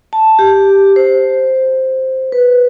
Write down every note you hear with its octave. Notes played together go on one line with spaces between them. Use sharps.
A5
G4
C5
B4